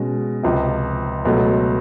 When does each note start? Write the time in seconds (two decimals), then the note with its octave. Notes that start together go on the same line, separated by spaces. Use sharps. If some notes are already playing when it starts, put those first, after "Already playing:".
Already playing: B2 G#3 C#4
0.43 C#2 C3 F3
1.25 C#2 B2 F#3 A3